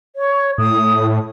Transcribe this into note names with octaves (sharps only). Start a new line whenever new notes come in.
C#5
A2 D#6